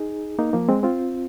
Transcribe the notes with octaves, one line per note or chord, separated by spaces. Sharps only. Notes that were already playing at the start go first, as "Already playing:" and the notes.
Already playing: D#4 G#4
A#3 D#4
F3 A#3
G#3 C4
C4 F4